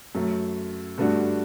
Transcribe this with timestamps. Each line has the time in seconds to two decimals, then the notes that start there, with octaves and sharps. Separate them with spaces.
0.15 F#2 F#3 A3
0.98 G2 D3 A3 D4 F#4